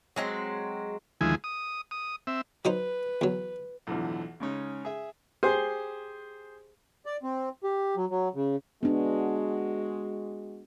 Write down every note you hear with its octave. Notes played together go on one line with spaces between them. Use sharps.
F#3 G#3 C4
D2 D#3 F3 G#3 E4 G#5
D#6
D#6
C4 E5
F#3 D#4 B4 C5
E2 F#3
B1 E2 A2 D3 F3
C#3 G#3 C#4 D#4
G#4 E5
G4 G#4 C5 C6
D5
C4
G4
F#3
F#3
C#3
G#3 B3 D4 F#4